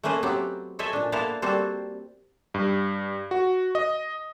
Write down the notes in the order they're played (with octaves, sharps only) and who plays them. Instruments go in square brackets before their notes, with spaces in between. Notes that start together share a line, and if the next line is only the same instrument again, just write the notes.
[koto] A3 A#3 C#4 B4 C5 D#5
F#3 B3 C4 G4
A4 C5 C#5 D#5 E5 G#5
A#2 D4
A#3 B3 E4 A4 C5 F5
G3 A#3 C4 F#4 A4 C5
[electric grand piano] G2
F#4
D#5